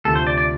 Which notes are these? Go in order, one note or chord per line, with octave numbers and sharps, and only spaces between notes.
D2 C3 F3 A4
C5
D5
D5